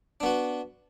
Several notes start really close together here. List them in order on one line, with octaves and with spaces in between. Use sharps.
D4 B3 F#4